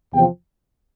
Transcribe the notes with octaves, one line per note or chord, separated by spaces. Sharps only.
E2 C3 F3 G5